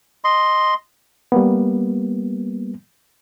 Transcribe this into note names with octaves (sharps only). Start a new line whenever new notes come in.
D#5 C6
G3 A#3 B3